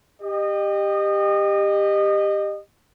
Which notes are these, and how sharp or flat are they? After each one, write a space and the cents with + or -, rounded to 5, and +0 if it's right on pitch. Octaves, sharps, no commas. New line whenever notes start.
G4 +15 D#5 -25